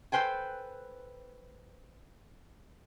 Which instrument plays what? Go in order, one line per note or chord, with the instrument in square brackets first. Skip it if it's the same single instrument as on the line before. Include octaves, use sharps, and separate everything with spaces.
[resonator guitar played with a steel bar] A4 B4 C5 G5 G#5